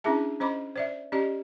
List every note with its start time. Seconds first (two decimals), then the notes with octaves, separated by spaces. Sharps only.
0.04 C#4 D4 E4 G#4 E5 A5
0.40 C#4 C5 D#5 B5 D6
0.76 C5 D5 E5
1.12 C#4 G4 D5 D#5